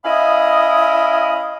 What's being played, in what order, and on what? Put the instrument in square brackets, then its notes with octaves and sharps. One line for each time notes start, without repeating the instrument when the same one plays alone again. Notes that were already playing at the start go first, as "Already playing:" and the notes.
[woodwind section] C#4 E4 D#5 F5 B5 D#6